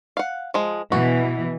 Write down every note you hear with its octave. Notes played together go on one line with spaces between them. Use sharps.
F5 F#5
F3 G#3
B2 E3 F#4